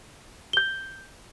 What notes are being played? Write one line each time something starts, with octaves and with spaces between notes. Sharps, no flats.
G6 G7